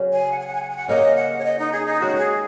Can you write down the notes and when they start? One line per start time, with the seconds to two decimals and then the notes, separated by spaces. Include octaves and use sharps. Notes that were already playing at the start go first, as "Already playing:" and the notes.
Already playing: C#3 F#3 C#4
0.13 G#5
0.32 F#5
0.39 G#5
0.47 F#5
0.55 G#5
0.62 F#5
0.70 G#5
0.77 F#5
0.88 C#3 A#3 C#4 D#5
1.16 F#5
1.39 C#5
1.45 D#5
1.59 D#4
1.72 G#4
1.86 D#4
2.00 D#3 G#3 C#4 F#4
2.15 A#4
2.19 G#4